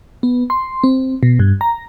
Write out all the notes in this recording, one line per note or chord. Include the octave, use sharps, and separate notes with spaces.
B3
C6
C4
B2
G2
A#5